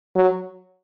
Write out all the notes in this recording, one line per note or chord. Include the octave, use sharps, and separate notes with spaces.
F#3